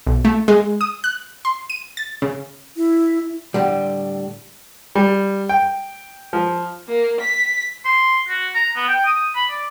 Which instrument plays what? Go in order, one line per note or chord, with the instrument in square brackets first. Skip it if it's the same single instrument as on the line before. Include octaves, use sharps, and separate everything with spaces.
[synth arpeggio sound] B1
A3
G#3
D#6
F#6
C6
D#7
A6
C#3
[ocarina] E4
[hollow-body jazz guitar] A2 D3 G3
[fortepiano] G3
G5
F3
[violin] A#3
B6
[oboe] C6
F#4
A#5
B3
G5
D#6
B5
D5